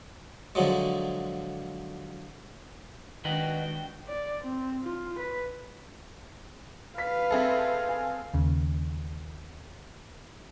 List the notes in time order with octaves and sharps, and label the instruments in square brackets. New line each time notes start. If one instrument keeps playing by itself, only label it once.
[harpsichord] D3 F3 F#3 G#3
[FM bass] D#3 [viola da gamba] G#3 D4 F#4 [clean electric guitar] B4 D#5 F#5 [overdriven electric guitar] G5
[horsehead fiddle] D5
C4
F4
B4
[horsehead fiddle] B4 [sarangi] F5 [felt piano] B6
[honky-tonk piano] C4 G#4 A4 [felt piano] E5
[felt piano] G#5
[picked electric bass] D#2 C#3